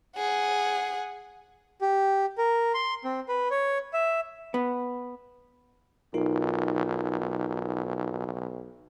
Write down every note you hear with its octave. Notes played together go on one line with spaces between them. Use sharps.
G#4 F#5
G4
A#4
C6
C4
B4
C#5
E5
B3
B1 D#4 F4 A#4